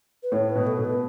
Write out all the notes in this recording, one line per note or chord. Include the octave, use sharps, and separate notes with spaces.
B4
A2 C#5
B4
B2
A4
B2
B4